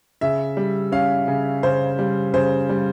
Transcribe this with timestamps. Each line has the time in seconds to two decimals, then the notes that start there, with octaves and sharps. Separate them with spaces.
0.21 C#3 E5
0.57 G3
0.92 C#4 F5
1.28 C#3
1.63 C#3 C5
1.99 G3
2.34 C#3 C5
2.69 G3